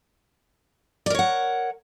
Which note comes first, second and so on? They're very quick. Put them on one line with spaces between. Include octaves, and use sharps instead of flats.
D5 A#4 C#5 F#5